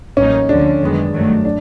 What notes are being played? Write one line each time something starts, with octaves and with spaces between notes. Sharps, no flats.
A1 A2 F#3 A#3 C#4 D#4
D2 D3 F3 D4
F#2 D#3 G#3 B3
G2 D#3 F#3 A3
D4